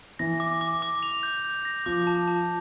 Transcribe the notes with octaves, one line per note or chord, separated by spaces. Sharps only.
E3 A#6
D6
D6
D6
F7
G6
G6
A#6
F3 D6
A5
A5